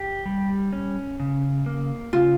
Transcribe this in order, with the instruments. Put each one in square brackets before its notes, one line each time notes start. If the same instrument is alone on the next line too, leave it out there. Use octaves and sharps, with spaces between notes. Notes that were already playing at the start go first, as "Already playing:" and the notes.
Already playing: [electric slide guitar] G4
G3
C#4
C#3
A#3
[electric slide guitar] C#3 [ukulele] F4